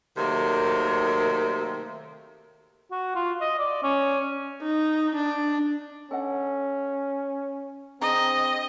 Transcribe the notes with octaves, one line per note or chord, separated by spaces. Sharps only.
C3 D#3 F#3 A3 A#3
F#4
F4
D#5
D5
C#4
D#4
D4
C#4 A4 D#5 F#5
C4 D4 G#4 D#5 A#5